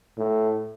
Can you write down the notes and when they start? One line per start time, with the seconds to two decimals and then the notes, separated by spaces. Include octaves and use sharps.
0.18 A2